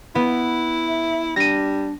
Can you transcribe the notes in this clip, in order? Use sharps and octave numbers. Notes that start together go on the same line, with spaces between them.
B3 E4
E5
G3 D4 A#6 D#7